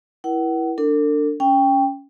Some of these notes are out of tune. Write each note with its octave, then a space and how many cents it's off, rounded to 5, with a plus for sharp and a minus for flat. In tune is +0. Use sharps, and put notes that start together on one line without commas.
E4 +0 A#4 +45 F#5 +35
D4 +0 A4 +45
C#4 +10 G5 +10